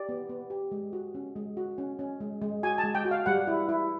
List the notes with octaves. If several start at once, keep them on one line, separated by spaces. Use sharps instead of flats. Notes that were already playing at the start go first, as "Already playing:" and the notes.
Already playing: G4 D5
B3
B3
G4
G#3
F#4
C#4
G#3
F#4
C#4
C#4
G#3
G#3
F#4 G#5
A5
G#3
G5
F#4
F5
G3 F#5
E4
E4